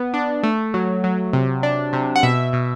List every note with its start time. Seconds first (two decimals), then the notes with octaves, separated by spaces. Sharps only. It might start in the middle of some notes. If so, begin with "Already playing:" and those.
Already playing: B3
0.14 D4
0.43 A3
0.74 F#3
1.04 F#3
1.33 C3
1.63 D4
1.93 C3
2.16 F#5
2.23 B2 E5
2.53 B2